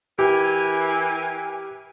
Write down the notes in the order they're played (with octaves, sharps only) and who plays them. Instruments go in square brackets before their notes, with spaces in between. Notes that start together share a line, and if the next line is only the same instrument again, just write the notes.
[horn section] E3 A#4 G#5 [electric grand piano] G4